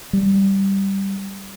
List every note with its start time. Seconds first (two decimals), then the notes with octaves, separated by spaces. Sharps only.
0.13 G3